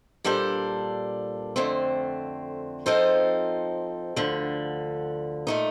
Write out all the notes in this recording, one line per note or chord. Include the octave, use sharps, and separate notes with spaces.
A#2 G3 D4 A4 C5
F2 D3 A3 C4
F3 C4 D#4 A4 C5
D2 D3 F3
A#2 A3 D#4